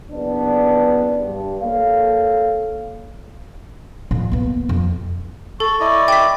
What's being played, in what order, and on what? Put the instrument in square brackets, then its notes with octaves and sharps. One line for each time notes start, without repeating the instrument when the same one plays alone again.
[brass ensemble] F#1 B3 D4 B4 D5
G2
A#3 A4 C#5 F5
[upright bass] F2 A2
A#3 B3
F2
[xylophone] A4 [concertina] A5 [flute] C#6
[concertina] E4 D5 D#5
[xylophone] G5 B6 [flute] D6